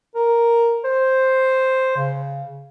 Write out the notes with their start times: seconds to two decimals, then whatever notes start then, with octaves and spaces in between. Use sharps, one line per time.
0.15 A#4
0.84 C5
1.97 C#3